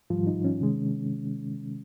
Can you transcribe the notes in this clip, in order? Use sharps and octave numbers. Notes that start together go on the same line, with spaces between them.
G#2 D#3 F3 G3 F4
D#4
C#4
C3 D#3 G#3